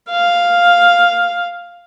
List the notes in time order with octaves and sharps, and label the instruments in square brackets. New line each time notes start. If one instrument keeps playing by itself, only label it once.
[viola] F5